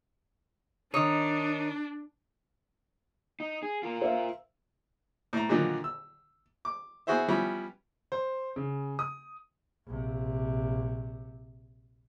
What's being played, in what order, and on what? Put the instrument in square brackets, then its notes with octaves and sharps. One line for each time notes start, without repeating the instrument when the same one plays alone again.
[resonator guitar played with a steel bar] D#3 C#5 [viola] D4 [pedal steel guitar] D#4 D#6
[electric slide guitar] D#4
G#4
F4 A#4
[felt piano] C5 E5 F5
[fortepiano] A2 A#5
A#2 D3 D#3 F3 F#3
E6
D6
B3 E4 F#4 G#4 C5 E5
F3 G3 B3 C#4 E4
[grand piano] C5
C#3
D#6
[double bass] A#1 C3